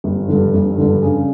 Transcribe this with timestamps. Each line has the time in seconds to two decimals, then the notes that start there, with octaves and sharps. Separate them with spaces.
0.04 G1
0.28 G2 D3
0.54 G1
0.78 G2 D3
1.02 C#3